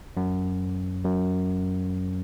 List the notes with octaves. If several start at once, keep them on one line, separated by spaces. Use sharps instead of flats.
F#2
F#2